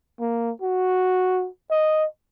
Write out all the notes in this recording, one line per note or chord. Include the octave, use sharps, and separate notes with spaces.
A#3
F#4
D#5